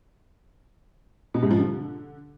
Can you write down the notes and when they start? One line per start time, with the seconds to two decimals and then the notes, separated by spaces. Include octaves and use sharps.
1.34 B2
1.42 G#2
1.51 F3
1.59 D3